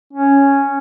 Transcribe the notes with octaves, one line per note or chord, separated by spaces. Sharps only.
C#4